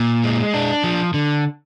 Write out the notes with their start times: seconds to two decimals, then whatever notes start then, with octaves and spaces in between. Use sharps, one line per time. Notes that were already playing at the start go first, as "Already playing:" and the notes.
Already playing: A#2
0.24 G#3
0.54 D4
0.84 F3
1.14 D3